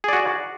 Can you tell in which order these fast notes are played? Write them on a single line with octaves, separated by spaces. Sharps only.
G#4 D5 F#4